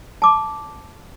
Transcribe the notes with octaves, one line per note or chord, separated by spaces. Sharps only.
A5 D6